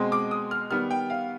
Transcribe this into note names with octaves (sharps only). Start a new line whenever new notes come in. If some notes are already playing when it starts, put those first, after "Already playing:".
Already playing: B2 G#3 C4
D6
D#6
F6
D#3 G3 B3 F6
G5
F5